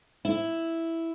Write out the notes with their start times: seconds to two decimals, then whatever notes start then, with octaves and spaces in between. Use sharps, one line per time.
0.25 E4